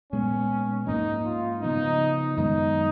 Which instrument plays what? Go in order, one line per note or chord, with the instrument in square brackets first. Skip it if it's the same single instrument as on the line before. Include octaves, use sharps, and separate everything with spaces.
[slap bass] A#2 G#3 B3 [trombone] C#4
[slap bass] G#2 F3 A#3 C#4 [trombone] D#4
[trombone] F4
[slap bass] C#3 F3 B3 [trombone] D#4
[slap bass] F#2 D#3 G#3 B3 [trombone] D#4